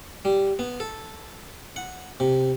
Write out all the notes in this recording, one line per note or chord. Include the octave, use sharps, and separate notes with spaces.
G3
B3
A4
F#5
C3